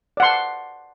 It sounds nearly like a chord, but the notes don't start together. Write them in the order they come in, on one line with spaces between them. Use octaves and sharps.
D5 F#5 C6 A5